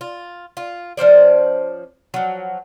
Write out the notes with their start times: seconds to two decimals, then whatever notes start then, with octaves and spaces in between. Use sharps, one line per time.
0.01 F4
0.57 F4
0.97 F3 C#4 C5 D5
2.14 F3 F#3